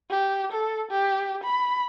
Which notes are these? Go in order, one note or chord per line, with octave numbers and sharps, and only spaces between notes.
G4
A4
G4
B5